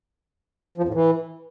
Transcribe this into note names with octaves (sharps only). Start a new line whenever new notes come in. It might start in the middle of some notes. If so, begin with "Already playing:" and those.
F3
F2
A2
E3